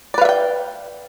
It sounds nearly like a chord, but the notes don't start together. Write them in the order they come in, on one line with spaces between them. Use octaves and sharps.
D5 B4 F5 E5 G5